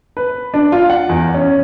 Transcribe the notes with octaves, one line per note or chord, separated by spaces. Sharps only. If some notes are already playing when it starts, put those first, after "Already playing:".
B4
D4
F4
F#5
E2
C#4